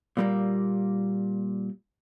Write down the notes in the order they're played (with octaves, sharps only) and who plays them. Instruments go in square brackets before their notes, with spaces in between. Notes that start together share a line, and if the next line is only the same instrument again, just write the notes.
[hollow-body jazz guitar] A#2 G3 A#3